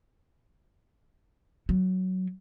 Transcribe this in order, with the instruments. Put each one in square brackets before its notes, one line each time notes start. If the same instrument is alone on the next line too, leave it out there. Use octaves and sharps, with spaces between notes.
[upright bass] F#3